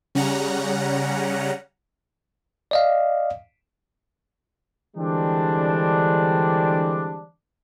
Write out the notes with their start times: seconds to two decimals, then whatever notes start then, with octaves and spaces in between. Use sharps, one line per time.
0.15 C#3 G3 C#4 F#5 A#5
2.71 D5 D#5 F5
4.97 D3 E3 G3 G#3 C4 D4